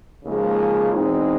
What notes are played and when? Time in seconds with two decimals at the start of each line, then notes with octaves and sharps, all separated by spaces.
0.25 D#2 C#3 F3 G#3
0.92 E2 B2 G#3 C4 D#4